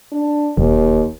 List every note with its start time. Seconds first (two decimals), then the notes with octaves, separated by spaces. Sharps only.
0.12 D4
0.57 E1 D#2